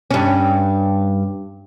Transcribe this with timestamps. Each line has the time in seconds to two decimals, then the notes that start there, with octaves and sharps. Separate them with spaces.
0.11 G2 C#4